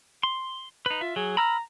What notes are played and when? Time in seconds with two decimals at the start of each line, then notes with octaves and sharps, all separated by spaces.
0.23 C6
0.86 D#4 B4
1.01 F4 E5
1.16 F#3 G#4
1.37 A#5 B5 E6 F6